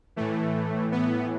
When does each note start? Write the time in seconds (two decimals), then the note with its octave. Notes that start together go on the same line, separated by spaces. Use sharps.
0.16 A2 E3 A3
0.92 B3